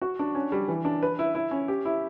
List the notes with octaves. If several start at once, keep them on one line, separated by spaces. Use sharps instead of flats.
F#4
D4
C#4
G3
E3
D4
B4
E4
E4
C#4
G4
E4